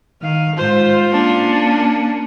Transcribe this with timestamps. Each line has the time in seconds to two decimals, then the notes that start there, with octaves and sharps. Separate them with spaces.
0.22 D#3 F5
0.57 G#2 F4 C5
1.11 A#3 C#4 D4